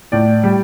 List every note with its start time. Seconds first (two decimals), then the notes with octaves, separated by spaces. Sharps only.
0.12 A2 D5
0.43 G3